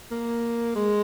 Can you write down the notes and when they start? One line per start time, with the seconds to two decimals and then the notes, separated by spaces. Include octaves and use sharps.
0.12 A#3
0.76 G#3